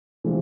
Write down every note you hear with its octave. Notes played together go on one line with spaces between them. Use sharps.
C3 E3 F3 G#3